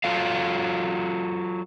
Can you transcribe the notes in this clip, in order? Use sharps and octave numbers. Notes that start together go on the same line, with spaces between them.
F#3 F4 A4 F5